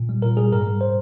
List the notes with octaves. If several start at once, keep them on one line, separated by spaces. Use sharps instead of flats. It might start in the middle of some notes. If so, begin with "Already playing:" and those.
Already playing: A#2
G3
A#2 A#4
G3 G#4
G#2 A#4
G3
C5